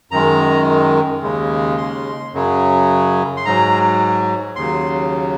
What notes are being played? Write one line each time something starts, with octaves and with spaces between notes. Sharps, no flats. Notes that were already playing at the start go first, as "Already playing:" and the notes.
F#2 D#3 G#3 A#5
D#2 C#3 G#3
C6
F#2 C#3 F#3
C6
G#2 F#3 A#5
D#2 C#3 F#3 C6